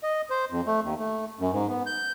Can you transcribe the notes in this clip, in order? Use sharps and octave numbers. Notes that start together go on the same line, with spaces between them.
D#5
C5
F2
A3
D#2
A3
F#2
G#2
B3
G6